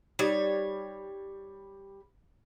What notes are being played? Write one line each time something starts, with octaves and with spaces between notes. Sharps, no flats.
G3 D#4 G4 C#5